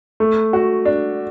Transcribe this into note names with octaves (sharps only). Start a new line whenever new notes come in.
A3
F#4
D4